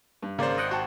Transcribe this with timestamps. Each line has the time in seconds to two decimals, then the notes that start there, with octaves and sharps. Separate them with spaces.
0.22 G2
0.39 G#1 C#3 A#3 C5 D5 F5
0.58 D#5 F#5 G5
0.71 F#4 F#5 G5 A5